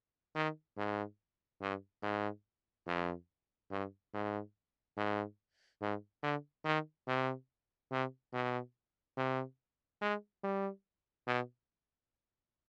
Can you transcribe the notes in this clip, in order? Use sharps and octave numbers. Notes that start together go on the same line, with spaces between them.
D#3
G#2
G2
G#2
F2
G2
G#2
G#2
G#2
D3
D#3
C3
C3
B2
C3
G#3
G3
B2